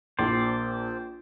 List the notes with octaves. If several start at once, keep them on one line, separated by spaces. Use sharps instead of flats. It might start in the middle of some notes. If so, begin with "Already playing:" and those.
A#1 C5 D5